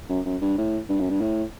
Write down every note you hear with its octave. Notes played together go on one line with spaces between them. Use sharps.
F#2
F#2
G2
A2
G2
F#2
G2
A2